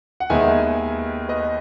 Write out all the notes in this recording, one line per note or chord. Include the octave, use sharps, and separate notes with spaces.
F#5
D#2 D#3 G#3 B3 E5 G#5
B4 D#5